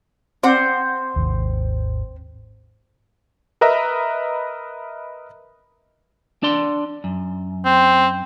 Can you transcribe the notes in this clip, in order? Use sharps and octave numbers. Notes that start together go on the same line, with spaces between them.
C4 C5 F#5
G#1 D#2
A#4 B4 D#5 E5 A#5 B5
D4 D5 C6
F#2
C4